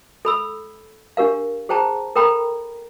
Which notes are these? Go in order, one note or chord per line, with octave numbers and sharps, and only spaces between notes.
A4 B5 E6
D4 G4 A#4 F5
G#4 C5 G5 A5 A#5
A4 A#4 G5 A#5 B5